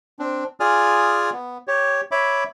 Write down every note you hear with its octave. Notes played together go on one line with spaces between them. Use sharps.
C4 D4
F4 G#4 D5 G#5 D#6 F6
B3
G4 C#5
C#5 E5 B5 D6